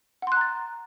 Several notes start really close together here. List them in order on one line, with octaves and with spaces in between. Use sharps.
F#5 C6 F#6 A#5 A6